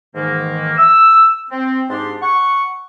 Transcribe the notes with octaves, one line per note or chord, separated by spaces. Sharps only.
G#2 D#3 E3 A#3
E6
C4
G#2 D4 G4 C6
F#5 C#6